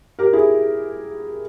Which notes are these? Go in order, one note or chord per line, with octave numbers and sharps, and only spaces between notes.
G4 A#4
E4 G#4